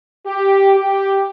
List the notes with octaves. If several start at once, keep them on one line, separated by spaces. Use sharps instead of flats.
G4
G4